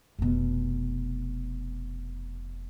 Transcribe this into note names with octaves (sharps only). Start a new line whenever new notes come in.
F1 B2